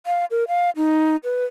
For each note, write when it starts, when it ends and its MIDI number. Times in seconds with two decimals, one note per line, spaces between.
0.06 0.25 77
0.31 0.44 70
0.48 0.70 77
0.76 1.16 63
1.24 1.45 71